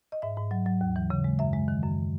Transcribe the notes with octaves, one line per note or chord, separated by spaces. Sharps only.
D#5
G#2 E5
G#2
F#3
F#3
D#2
E3
C#3
G#3
F#2 E5
G#3
D#3
F#2